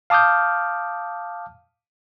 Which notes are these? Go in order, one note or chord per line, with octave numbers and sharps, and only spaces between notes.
F5 A5 D6 D#6 F6 G6